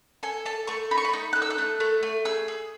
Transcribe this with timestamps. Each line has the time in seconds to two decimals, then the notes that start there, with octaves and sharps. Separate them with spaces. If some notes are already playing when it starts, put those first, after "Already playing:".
0.23 A4 G#5
0.45 A4 A5
0.67 A3 C#6
0.91 D#4 B5
0.98 C#6
1.05 B5
1.13 D#4
1.33 A4 F#6
1.42 E6
1.50 F#6
1.58 A3
1.80 A3
2.03 A3
2.25 G#4 E6
2.48 G#4